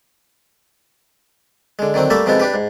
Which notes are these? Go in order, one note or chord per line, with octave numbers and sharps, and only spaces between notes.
D3 G#3
D3 D#3 F#3 C4
G3 A3 A#3 A4 E5
C3 F3 G#3 B3 D#4 A4
D4 G4 B4
G#2